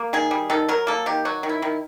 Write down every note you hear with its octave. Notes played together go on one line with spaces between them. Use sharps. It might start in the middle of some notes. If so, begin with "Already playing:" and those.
Already playing: A#3
D#3 G#4
G3
D#3 A4
F#3 A#4
A#3 A4
D#3 G4
F#3 F#4
D#3
E4
D#3